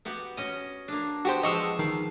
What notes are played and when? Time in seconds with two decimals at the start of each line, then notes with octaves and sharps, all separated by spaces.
0.05 B3 F#4 G4
0.37 C#4 D#5
0.88 A#3 D4
1.25 B3 F#4 G4 C5
1.43 F3 G#3 D#5 C#6 E6
1.79 D#3 F5